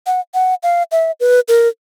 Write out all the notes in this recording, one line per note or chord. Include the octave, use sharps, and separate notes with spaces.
F#5
F#5
F5
E5
B4
A#4